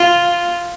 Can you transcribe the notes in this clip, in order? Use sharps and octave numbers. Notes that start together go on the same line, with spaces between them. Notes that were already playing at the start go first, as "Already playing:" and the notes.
Already playing: F4